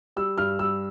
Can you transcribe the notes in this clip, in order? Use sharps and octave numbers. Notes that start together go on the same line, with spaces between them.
G3 E6
G2 F6
G3 E6